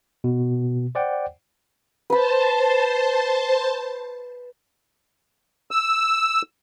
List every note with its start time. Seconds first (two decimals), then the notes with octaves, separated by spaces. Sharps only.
0.24 B2
0.95 C5 D5 F#5 G5
2.10 B4 C5 A5 B5
5.71 E6